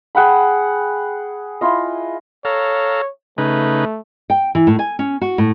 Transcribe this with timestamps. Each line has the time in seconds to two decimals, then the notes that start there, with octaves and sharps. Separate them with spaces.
0.15 G#4 F#5 G5 B5
1.61 E4 F4 D#5
2.45 A4 C#5 F5 A#5
3.38 C#3 A3 D#4 B4
4.30 G5
4.55 E3
4.67 A2
4.79 G#5
4.99 C#4
5.21 F#4
5.38 A2